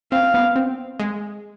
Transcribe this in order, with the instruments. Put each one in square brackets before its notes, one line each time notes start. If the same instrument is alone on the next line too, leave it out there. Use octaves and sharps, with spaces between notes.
[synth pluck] C4 [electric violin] F5
[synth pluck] B3
C4
G#3